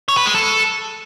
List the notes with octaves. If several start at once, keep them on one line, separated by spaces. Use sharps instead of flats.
C#5
B4
G#3
A4